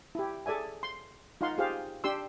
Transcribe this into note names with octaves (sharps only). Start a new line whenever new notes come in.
E4 G4
G#4 A4 D5 E5 G#5
C6
D#4 F4 F5 F#5 C6
F4 G4 G#4 C5 F5
D4 G4 C6 E6